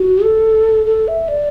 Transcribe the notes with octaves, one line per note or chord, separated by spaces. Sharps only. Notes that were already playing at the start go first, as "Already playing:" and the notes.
Already playing: F#4
A4
A4
E5
D5